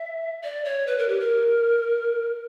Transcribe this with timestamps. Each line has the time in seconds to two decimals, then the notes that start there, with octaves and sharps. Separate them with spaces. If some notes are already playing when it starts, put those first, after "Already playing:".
Already playing: E5
0.43 D5
0.65 C#5
0.87 B4
0.98 A#4
1.08 G4
1.20 A#4